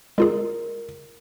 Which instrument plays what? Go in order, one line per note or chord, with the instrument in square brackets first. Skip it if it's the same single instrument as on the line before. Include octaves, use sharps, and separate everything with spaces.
[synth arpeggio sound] G#3 F4 G#4 [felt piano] A#4